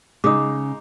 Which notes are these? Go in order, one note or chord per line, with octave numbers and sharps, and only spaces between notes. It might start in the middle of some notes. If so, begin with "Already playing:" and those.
C#3 G#3 D#4 D6 D#6